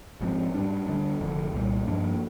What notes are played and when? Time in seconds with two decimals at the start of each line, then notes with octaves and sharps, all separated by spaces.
0.21 G#1 G#2 F3 C4
0.54 G#2 G3 D4
0.87 D2 D3 G3 D4
1.20 F1 F2 D3
1.53 C2 A#2 G3
1.87 G2 F3 A#3 D4